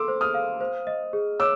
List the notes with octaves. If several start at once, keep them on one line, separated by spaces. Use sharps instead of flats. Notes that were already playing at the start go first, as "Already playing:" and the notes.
Already playing: A4 C6 D6 E6
C5
D#6 F6
F5
C5
D#5
G#4
C#5 D6 E6